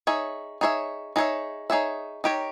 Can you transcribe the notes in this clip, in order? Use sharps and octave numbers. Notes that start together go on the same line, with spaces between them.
D#4 G#4 C#5 E5
D#4 G#4 C#5 E5
D#4 G#4 C#5 E5
D#4 G#4 C#5 E5
D#4 G4 A#4 C#5